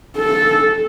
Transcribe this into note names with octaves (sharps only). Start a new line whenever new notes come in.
A4